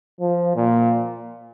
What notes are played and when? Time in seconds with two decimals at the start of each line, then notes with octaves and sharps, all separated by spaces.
0.21 F3
0.56 A#2